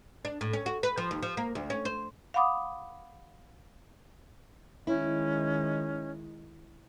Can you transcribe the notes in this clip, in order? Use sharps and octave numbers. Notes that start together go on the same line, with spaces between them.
D4
A2
C#4
F#4
B4
F3
D#2
F3
A#3
D2
C#4
C5
F5 F#5 B5 D6 D#6
D#3 G#3 C#4 E4